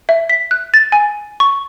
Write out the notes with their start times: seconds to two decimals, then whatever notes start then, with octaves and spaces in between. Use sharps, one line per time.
0.09 E5
0.29 B6
0.51 F#6
0.74 A6
0.92 G#5
1.40 C#6